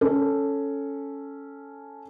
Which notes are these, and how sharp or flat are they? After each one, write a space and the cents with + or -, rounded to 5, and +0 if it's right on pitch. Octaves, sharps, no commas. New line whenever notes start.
C#4 +0 A4 +0